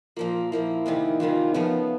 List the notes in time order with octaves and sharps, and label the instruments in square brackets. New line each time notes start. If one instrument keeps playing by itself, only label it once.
[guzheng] A#2 F3 A#3 [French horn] F4
[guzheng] A#2 F3 A#3 [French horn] E4
[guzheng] E2 C3 D#3 G3
[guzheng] E2 C3 D#3 G3 [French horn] F4
[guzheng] C#3 F3 A3 [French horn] B3